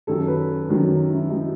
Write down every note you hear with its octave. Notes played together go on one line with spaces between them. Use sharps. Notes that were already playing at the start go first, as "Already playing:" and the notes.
F#2 D#3 F#3 A4
B4
F#2 D#3 F#3
E4
D#3 F#3 D#4